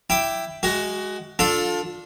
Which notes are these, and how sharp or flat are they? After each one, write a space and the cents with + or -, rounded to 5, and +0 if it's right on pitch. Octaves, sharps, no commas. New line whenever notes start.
E4 +10 G5 +0 D6 +0
G#3 +0 F#4 +20
D4 +0 F4 +25 A4 +0